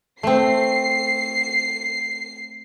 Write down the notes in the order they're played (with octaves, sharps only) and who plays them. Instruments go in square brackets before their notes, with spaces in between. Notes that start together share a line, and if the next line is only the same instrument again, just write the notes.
[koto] A3 C4 [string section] C7